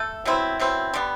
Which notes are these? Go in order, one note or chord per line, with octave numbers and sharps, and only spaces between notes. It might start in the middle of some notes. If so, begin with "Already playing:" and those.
Already playing: A3 A4
B2 F#3 C4 E4
B2 F#3 C4 E4
D3 G3 B3